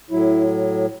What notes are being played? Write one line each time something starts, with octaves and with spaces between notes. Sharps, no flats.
A2 F#3 E4